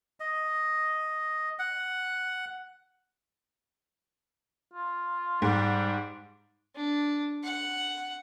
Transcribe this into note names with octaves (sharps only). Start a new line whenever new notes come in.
D#5
F#5
F4
G#2 G3
D4
F#5